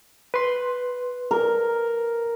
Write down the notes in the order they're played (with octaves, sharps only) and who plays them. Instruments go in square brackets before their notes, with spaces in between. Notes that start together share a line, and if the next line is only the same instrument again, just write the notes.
[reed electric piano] B4 C6
[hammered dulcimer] A#4